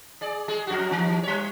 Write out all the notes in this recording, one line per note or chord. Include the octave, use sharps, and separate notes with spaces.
G#4 D5
G#3 G#4
F2 F#4
D#2 E3
G3 C#5